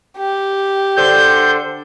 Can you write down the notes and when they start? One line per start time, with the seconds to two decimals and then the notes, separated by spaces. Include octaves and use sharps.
0.18 G4
0.96 D3 C5 G6